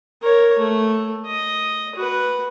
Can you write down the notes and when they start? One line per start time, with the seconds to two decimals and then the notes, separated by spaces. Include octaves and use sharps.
0.22 A#4 C#5
0.58 A3
1.26 D#5
1.95 F#4 B4